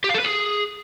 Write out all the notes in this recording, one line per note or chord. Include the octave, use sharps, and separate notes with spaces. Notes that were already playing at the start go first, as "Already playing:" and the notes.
G4
F5
A4
B4
G#4